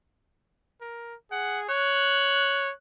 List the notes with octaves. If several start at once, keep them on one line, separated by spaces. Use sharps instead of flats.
A#4
G#4 F#5
C#5 F#6